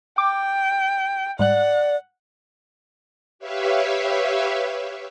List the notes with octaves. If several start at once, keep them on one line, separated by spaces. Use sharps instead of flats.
G5 D6
G#2 G3 D5 F#5 F#6
G4 B4 C#5 E5 F5